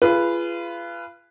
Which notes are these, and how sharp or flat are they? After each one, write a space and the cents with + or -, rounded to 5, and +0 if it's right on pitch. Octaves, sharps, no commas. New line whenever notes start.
F4 -30 G#4 +5 B4 +0